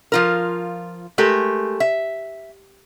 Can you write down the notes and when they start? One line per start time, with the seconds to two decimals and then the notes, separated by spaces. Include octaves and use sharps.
0.12 F3 F4 A#4
1.18 G#3 A3 G4 A#4
1.80 E5